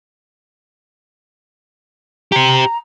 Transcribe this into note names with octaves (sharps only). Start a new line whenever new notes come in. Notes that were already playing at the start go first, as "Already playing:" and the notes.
G4 C5 A#5